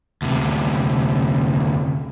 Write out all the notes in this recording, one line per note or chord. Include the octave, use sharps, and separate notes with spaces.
D2 C3